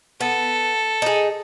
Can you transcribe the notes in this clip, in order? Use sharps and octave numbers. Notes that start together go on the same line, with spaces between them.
B3 A4
D#4 G#4